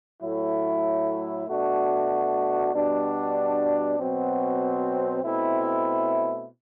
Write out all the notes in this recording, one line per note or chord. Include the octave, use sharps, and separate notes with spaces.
A2 F#3 A3 E4
B2 A3 D4 F#4
B2 G3 D4 F#4
B2 F#3 C4 F#4
B2 A3 C4 E4